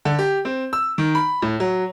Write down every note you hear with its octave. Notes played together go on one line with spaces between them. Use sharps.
D3
G4
C4
E6
D#3
B5
A2
F#3